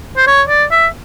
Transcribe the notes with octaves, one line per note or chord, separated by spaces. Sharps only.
C5
C#5
D5
E5